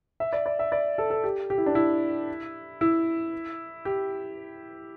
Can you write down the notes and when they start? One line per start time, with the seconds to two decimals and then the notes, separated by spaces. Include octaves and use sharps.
0.20 E5
0.33 D5
0.46 D5
0.59 E5
0.72 D5
0.98 A4
1.10 A4
1.24 G4
1.50 G4
1.58 E4
1.66 D4
1.75 E4
2.81 E4
3.85 G4